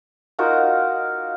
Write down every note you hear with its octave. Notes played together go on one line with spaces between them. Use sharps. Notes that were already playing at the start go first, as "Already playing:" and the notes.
D#4 F4 F#4 A#4